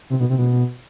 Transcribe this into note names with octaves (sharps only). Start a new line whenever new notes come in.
C3
B2
C3
B2